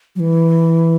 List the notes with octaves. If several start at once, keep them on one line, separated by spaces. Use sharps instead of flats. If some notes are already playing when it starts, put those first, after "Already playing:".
F#3
E3